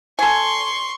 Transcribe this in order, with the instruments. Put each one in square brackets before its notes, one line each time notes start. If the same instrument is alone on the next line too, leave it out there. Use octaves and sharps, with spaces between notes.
[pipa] A4 G#5 [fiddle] C6 C#6